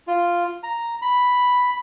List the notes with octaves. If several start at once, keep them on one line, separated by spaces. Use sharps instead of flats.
F4
A#5
B5